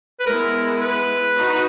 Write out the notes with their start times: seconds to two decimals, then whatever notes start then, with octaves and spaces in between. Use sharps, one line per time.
0.20 B4
0.26 G#3 B3 E4 A#4
0.81 B4
1.35 D#4 F#4